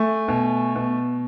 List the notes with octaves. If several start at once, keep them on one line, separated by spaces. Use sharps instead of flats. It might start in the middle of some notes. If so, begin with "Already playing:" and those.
Already playing: A3 G#5
B2
B2